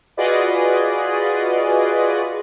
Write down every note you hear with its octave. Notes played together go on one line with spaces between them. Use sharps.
F4 F#4 G#4 B4 D5 D#5